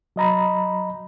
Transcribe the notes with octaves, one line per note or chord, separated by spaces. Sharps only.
F#3 D#5 A#5 B5